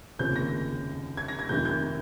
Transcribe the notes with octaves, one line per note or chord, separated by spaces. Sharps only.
F1 D#2 C#3 F3 C4 G6
A#6
G#6
A#6
G#6
F1 F2 C3 D#3 G6
G6